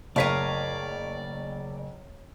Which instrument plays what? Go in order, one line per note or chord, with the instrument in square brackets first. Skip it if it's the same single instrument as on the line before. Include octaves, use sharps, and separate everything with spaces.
[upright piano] F#1 B6 D#7 [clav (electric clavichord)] A2 [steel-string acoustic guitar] A#4 C#5 F5 [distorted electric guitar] D5